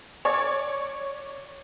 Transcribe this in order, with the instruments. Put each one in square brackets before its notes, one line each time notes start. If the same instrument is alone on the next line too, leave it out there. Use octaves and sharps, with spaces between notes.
[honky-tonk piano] C#5 D5 C#6 D6 G#6